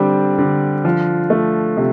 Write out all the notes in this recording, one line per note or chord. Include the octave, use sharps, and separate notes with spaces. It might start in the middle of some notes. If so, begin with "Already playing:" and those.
Already playing: D3 G3 C4
D3
F3
A3
C3